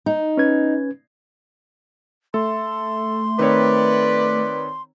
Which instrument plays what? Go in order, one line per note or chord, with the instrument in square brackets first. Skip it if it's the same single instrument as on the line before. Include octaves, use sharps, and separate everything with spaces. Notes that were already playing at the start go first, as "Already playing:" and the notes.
[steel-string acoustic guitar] D#4
[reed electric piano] C#4 B4 G#6
[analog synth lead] A3 [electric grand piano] A4 [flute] C6
[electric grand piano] D#3 C4 C#5 [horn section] B4 D5